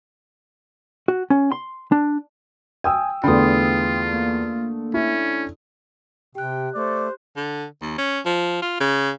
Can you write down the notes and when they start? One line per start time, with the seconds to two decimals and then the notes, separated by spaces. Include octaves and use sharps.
1.08 F#4
1.30 C#4
1.52 C6
1.92 D4
2.84 G5 G#5 D#6 E6
3.24 E2 D3 A3 F4 G5 B5 C6 D#6
4.14 A#3
4.94 C#4 E4
6.35 C3 G4 G5 F#6
6.75 A3 C5 D5
7.36 D3
7.81 D#2
7.98 C#4
8.25 F3
8.62 F4
8.80 C#3